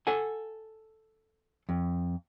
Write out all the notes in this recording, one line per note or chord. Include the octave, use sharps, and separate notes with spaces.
A4 F#5 G#5
F2